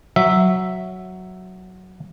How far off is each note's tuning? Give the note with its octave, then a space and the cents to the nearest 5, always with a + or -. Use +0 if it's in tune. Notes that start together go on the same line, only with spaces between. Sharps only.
F#3 +0 E5 +0